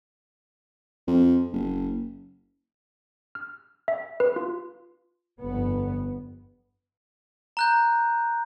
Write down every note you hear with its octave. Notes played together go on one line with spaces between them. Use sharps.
F2
F#1
F6
E5
B4
F4
G1 F2 B3
A#5 F#6 G6